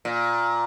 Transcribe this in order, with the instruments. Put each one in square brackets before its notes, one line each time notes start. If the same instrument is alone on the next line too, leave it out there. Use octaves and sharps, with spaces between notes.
[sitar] A#2